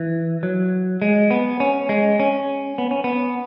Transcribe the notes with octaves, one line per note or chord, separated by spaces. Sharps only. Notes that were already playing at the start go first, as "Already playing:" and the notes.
Already playing: E3
F#3
G#3
B3
C#4
G#3
C#4
B3
C#4
B3